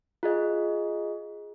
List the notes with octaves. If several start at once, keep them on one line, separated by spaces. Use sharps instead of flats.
F4 G#4 D#5